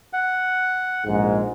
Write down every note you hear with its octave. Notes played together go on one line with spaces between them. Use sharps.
F#5
A#1 G#2